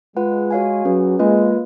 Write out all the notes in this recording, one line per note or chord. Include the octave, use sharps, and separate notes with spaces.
G#3 F4 B4 F#5
F#4 C#5 F5 G#5
F#3 C#4 G#4 B4
G#3 A#3 F4 B4 D#5